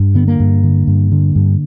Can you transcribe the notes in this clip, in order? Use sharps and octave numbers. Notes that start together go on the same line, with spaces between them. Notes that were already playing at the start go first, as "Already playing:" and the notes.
Already playing: G2
D3 B3
A#3
G2
D3
G2
D3
G2